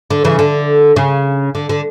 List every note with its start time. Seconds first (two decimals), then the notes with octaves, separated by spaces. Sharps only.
0.10 D3
0.25 C#3 E3
0.39 D3
0.96 C#3
1.55 D3
1.69 D3